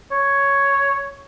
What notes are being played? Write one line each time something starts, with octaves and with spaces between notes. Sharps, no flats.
C#5